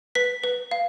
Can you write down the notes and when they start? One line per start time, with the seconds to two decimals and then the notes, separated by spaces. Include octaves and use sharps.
0.15 B4 B6
0.44 B4
0.71 F5